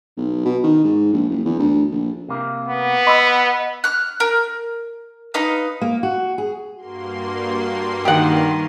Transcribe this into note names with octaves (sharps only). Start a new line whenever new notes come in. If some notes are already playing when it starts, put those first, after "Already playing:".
B1
B2
D#3
G#2
A#1
F#1
E2
D2
A#1
C3 A#3
B3
D#5 B5 E6
F6 F#6
A#4
D#4 B4 D#5 F5
A#3
F#4
G#4
G2 A#3 F#4 C6
D#3 G4 F#5